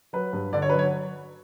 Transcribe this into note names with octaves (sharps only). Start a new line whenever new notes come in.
F#3 B4
G2
D3 D5
C#5
F#3 B4
C#5